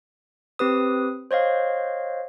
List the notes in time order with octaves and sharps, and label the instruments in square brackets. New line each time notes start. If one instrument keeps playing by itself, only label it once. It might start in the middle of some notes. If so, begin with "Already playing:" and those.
[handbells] C4 G4 B4 D#6
C5 C#5 D#5 F5